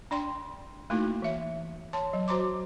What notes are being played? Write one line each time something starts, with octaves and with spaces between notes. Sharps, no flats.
D4 D5 G5 C6
A3 A#3 D#4 E4 F#4
E3 E5
C#5 A5 C6
F#3
F#4 C5 A#5 C6 D6